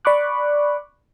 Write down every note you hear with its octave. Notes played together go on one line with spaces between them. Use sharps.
D5 B5 C#6 D6 F#6